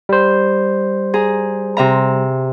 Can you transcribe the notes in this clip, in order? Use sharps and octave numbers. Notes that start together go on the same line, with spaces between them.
G3 C5
G#4 A#5
C3 E5 A#5